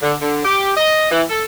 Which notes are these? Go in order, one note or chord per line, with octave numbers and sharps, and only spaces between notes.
D3
D3
G4
D#5
E3
A4